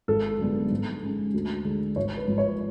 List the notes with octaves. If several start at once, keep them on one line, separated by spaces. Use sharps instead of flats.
G#1 A4
F#2 D3 G#3 B3
G#2
G#3 C#4
D2
D3 G#3
G#1 C#5
B4
G#2 F3
C#5